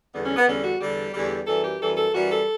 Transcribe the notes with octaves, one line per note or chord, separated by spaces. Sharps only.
E2 D3 G3 B3
C#4
B3
E2 D3 G3 C#4
F#4
E2 D3 G3 G4
E2 D3 G3
F#2 E3 G3 A4
G4
F#2 E3 G3 A4
A4
F#2 E3 G3 F#4
A4